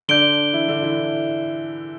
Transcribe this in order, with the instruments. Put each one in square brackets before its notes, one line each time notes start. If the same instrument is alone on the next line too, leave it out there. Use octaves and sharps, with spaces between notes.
[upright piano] D3 D4 [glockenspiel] G6 D7 G7
[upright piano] E3 E4
D3 D4
E3 E4